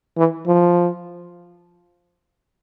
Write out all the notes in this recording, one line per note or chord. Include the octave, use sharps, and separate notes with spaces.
E3
F3